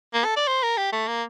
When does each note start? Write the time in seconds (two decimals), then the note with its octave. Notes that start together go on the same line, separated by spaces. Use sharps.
0.13 A#3
0.24 A4
0.36 D5
0.47 C5
0.62 A#4
0.77 G4
0.92 A3
1.07 A#3